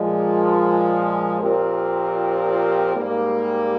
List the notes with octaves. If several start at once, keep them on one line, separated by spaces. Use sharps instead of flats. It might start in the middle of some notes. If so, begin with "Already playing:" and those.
Already playing: A#2 F3 G#3
A#2 F3 C4 G4 A#4
G#2 G3 A#3